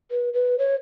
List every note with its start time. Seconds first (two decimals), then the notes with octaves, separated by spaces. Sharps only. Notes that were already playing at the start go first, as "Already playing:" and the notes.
0.11 B4
0.34 B4
0.58 C#5